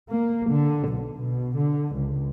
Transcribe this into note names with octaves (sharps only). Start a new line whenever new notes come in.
A#3
D3
B1
B2
D3
C#2